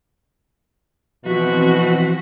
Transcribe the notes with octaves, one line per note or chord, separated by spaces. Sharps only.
B2 E3 F3 C4 F#4 B6